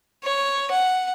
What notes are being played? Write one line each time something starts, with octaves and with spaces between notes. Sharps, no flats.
C#5
F#5